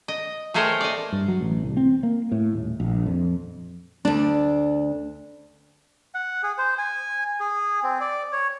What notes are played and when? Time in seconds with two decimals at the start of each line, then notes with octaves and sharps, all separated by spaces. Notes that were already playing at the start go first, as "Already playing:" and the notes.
0.08 D#5
0.54 A3 G#4 A#4 C5 C#5 G5
0.81 D5 D#5
1.12 G2
1.28 F#3
1.41 A1
1.63 C2
1.77 C4
2.03 A#3
2.32 A2
2.53 D#1
2.80 A#1
3.06 F2
4.05 D2 D4
6.14 F#5
6.43 G#4
6.58 C5
6.78 G#5
7.40 G#4
7.83 C4
8.01 D5
8.32 C#5